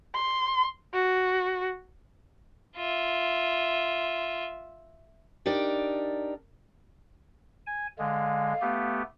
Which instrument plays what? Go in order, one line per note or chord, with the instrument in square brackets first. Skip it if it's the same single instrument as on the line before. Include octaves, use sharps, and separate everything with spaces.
[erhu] C6
F#4
[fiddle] F4 E5
[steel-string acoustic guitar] D4 D#4 G4 A#4 D5
[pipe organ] G#5
[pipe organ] D3 G#3 [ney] F5
[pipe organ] A3 B3 G4